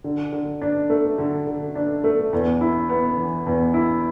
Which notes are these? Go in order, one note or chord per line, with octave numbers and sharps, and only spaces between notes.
D3
D3
D4
A3
D3
D3
D4
A3
E2
E4
B3
E3
E2
E4